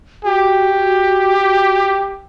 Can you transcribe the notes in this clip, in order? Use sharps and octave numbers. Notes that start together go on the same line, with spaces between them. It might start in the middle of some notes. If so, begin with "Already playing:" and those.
F#4 G4